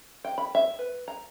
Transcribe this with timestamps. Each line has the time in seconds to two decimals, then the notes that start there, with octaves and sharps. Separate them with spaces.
0.25 G5
0.38 B5
0.55 E5
0.79 B4
1.08 A#5